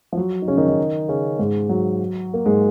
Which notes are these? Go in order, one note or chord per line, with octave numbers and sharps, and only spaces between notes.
F3
F#3
D#4
C#3 C#4
D#3 D#4
D#3 D#4
C#3 C#4
G#2 G#3
F#3
A#3
G#2 G#3